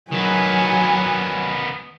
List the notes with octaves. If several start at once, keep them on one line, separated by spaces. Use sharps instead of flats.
D#3 F#3 B3 G#5